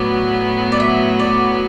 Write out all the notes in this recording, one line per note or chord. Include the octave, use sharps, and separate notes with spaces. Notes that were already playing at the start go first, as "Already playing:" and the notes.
Already playing: A2 F#3 B3 D5
D5
E5
D5